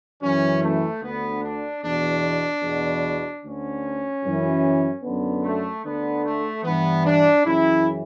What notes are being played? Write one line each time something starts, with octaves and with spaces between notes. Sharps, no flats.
F#2 E3 C#4
A3
D2 D3 B3
D4
E2 B2 D4
E2 B2
D2 D3 C#4
F#2 E3
F#2 D3 B3
A3
D2 D3 B3
A3
G2 E3 B3
D4
F#2 C#3 E3 E4